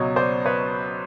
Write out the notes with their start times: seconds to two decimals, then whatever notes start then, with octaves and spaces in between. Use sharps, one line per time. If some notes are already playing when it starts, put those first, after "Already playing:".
Already playing: C#2 B2 F#3 C#5 D#5
0.16 C5 D5
0.45 B4 C#5